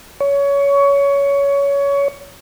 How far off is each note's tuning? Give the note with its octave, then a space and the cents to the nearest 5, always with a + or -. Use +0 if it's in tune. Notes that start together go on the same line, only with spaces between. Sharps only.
C#5 +20